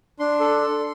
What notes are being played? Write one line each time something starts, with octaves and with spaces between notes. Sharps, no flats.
D4 C6
A4
A4